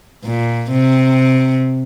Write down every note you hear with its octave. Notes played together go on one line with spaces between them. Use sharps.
A#2
C3